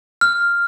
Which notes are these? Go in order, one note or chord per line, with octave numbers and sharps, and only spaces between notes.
F6